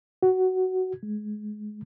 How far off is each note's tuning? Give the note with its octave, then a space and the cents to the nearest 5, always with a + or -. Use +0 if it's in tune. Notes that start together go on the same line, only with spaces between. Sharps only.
F#4 +10
G#3 +25